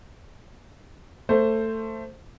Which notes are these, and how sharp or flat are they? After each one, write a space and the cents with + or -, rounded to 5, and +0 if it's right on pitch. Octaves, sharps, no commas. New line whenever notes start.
A3 +15 C5 +0